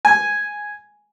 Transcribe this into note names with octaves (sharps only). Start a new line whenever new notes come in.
G#5